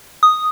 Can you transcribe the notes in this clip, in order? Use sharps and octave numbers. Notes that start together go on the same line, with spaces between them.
D#6